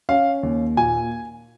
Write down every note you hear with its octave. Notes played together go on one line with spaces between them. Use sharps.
C#4 F5
D#2
A#2 G#5